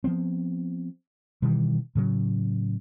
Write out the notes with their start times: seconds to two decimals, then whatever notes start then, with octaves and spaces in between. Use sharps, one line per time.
0.04 F3 B3 C4
1.42 B2 D#3 E3 G3
1.95 A2 C#3 F#3